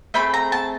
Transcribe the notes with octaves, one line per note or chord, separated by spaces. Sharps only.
A3 C4 G#4 B5
A#5
A5